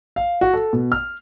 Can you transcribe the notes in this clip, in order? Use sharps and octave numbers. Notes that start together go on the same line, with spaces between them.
F5
F#4
A4
B2
F6